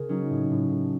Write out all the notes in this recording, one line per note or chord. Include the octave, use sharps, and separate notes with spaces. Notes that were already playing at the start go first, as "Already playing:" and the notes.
Already playing: C#3 G#4 A#4
F#3 C#4 D#4
A2
A2
A2